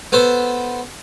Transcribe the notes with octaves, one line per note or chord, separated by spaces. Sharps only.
B3 A4 C5